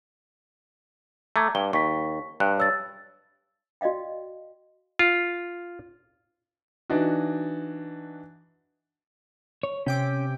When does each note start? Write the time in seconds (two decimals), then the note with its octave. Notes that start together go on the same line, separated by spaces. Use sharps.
1.36 A3 A#5 D6 G#6
1.55 G2 G7
1.73 D#2 C#6 B6
2.40 G2 F#6
2.58 C#5 E6 A6
3.81 F#4 D5 D#5 F5 G5
4.99 F4
6.90 E3 D4 D#4 F#4
9.63 C#5
9.86 C3 C#4 G5 D6